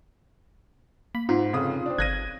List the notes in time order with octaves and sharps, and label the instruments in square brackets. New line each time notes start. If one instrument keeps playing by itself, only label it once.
[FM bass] A#3 [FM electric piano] B5
[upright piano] G#2 [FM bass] D#4 [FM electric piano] F4
[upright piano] F1 C#3 D#6
C4 D4
[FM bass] G1 [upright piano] F#6 A#6 D#7 [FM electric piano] G#6